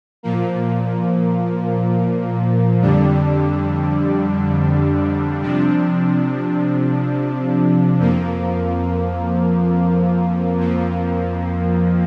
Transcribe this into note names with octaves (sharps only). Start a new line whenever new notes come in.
A#2 F3 A#3
F2 D3 G3 D4
C3 F3 D4
F2 F3 A#3
F2 F3 A#3